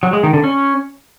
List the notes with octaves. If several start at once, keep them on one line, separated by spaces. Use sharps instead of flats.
F#3
G#3
D#3
D3
C#4